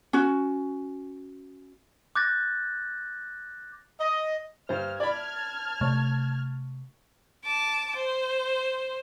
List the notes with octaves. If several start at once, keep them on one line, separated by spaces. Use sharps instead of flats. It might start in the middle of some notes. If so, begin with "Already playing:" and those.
C#4 F#4
D6 F#6 G6 A6 A#6
D#5
G2 C5 F6
D5 A5 B5 F6 G#6
C3 A3 C#5
A5 D6
C5